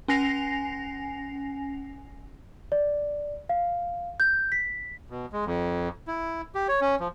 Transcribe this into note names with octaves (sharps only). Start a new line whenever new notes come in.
C#4 G#5 A#6 C7 F7
D5
F5
G6
B6
B2
G#3
F2
E4
G4
C#5
C#4
F3